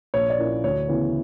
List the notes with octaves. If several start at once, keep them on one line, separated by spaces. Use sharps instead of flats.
A#1 C#5
D5
A#2 A#3 C#4 E4
D2 C#5
C#3 E3 B3